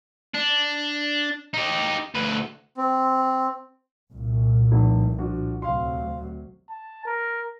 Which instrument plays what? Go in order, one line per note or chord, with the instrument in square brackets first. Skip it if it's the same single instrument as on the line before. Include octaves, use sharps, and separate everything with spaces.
[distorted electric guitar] D4
D#4 G4
D2 B4
[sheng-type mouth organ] C4
[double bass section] C2 A#2
[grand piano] F1
F3 D4 F#4
[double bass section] D2 C3 F#3 [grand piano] F5 C6
[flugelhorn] A5
A#4